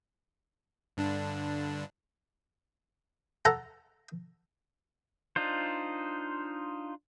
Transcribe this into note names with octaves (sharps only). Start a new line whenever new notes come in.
G2 D3 D4
A4 F#5 A5 A#5
D4 D#4 F4 C5